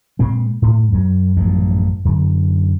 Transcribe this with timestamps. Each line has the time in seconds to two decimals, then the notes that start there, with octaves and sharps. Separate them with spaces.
0.19 A#2 G#3 C4
0.62 A2
0.92 F#2 F#3
1.36 A1 F#2 A#2 F3
2.05 F#2 D3